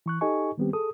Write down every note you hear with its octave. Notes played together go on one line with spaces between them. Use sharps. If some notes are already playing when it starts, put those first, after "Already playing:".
E3 C#6 F#6
D#4 G4 A4 D#5 G#5 C#6
D#3 G3 B3 C4 G4
G#4 A4 D#6